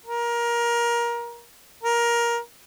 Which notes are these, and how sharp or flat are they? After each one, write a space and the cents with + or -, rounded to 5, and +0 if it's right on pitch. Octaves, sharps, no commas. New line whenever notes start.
A#4 +20
A#4 +15